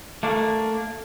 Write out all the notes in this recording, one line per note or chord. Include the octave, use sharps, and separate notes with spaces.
A3 A#3 D4